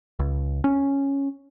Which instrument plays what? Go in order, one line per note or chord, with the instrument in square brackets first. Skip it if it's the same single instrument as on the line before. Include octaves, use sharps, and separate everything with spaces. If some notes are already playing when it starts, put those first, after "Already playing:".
[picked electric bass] C#2
C#4